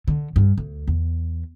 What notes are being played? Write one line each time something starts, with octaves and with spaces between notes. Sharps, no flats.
D3
G2
D2
E2